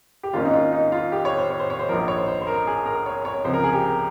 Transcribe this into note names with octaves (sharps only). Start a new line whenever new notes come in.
G4
G#1 G#2 D#3 A#3 C#4 F4
D#4
F4
D#4
F4
G4
C#5
C5
C#5
C5
C#5
C5
A#1 G#2 F3 A#4
C#5
C5
C5
C5
A#4
G#4
A#4
C#5
C#5
C#2 C3 F3 C5
A#4
G#4
G4
A#4